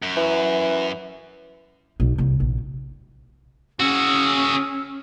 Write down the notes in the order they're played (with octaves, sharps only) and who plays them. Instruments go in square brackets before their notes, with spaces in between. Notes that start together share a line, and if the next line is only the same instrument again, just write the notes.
[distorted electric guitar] F#2
[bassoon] E3
[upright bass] B1
C2
A#1
[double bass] C#4 [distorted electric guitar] F#4 G#4 [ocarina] E6